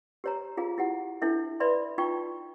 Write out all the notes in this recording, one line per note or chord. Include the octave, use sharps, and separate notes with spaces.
G4 C#5 A#5
F4 G#4 F5
E4 G4 F#5
D4 E4 A4 E5
B4 D5 E5 B5 C6
D#4 F4 G5 C#6